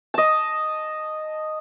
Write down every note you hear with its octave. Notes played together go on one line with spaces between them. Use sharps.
D#5 A5